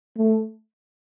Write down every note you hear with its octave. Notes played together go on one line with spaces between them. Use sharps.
A3